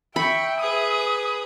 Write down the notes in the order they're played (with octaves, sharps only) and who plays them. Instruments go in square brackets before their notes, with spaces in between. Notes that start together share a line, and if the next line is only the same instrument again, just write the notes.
[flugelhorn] E5 [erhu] G5 [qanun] B5 [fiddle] C#6
[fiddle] G#4 B4 [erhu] D#6